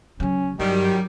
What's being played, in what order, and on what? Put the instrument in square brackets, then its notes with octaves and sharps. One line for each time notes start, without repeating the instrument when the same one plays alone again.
[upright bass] C#3 F#3 [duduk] C#4
[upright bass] G2 [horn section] D#3 G3 [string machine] F#3 [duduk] G4